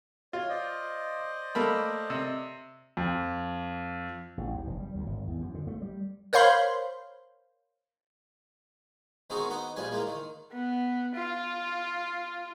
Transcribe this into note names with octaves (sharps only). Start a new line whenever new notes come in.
F4 C#5
C5 D5 D#5
A3 A#3 B5
C3
F2
A1
D#2
F1
G3
D2
G#1
E2
F#2
D3
A3
G3
A#4 C5 C#5 F5 B5 C6
D#3 G#3 B3 C4 D#4 F#4
B3 D#4 F#5
A#1 F3 G3 B4 G#5
E3 G#3 A#3
D#3
B3
F4